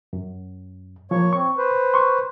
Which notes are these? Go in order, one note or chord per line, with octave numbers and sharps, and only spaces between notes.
F#2
F3 A#3 C#5 C#6
C4 C#6
B4 C5
C6 C#6